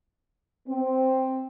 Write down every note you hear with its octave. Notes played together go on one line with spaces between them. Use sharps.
C4